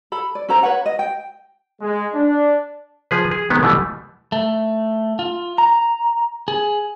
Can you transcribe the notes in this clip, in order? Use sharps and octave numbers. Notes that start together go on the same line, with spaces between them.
A4 B5
D5
C#4 A4 C5 A#5
B4 C#5 F#5
D#5
G5
G#3
D4
F3 G#4 B4
G#4
D#3 G#3 B3
B2 E3 G3 A3 B3
A3
F4
A#5
G#4